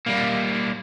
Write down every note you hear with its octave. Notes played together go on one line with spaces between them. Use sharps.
G3 A#3